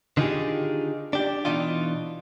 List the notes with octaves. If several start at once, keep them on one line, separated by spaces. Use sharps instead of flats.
D3 D#3 D#4 F4 G4 G#4
D4 G4
B2 E3 D4 D#4 F4